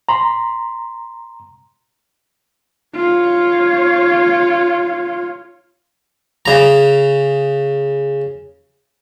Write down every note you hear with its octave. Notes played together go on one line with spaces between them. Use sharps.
A#5 C6
F4 C#5
C#3 A#5